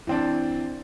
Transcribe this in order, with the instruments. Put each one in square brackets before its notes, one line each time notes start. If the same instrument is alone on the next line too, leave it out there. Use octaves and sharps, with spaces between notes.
[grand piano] E3 C4 D4